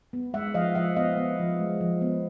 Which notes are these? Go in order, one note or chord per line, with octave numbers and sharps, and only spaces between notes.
B3
G#3 E5 F#5
F3 D#5 F5
F3 E5 F#5
B3 D#5 F5
B3
F3
G#3
F3
B3